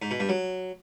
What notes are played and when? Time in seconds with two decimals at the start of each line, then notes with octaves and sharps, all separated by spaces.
0.02 G#2
0.11 B2
0.20 G2
0.29 F#3